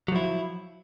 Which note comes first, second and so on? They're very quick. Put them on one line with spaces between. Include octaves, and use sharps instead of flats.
F#3 F3 E4